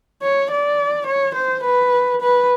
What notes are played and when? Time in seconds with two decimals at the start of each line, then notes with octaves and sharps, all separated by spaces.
0.22 C#5
0.51 D5
1.07 C#5
1.35 C5
1.64 B4
2.22 B4